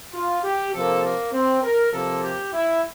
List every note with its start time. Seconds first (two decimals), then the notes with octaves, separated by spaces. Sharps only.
0.13 F4
0.43 G4
0.73 C3 F3 A#3 A4
1.03 A#3
1.33 C4
1.63 A#4
1.93 C3 F3 A#3 A4
2.23 G4
2.53 E4